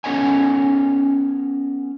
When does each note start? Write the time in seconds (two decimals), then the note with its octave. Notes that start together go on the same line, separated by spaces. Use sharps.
0.04 B3 C#4 A4 C#5 D#5 G#5